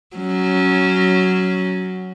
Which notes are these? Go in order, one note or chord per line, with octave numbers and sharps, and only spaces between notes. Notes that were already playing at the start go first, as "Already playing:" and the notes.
F#3 C#4